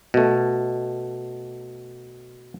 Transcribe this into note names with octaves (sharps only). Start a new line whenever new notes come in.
B2 A3